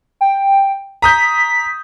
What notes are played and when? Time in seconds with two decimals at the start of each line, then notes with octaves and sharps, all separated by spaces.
0.21 G5
1.02 A#5 D#6 G6 B6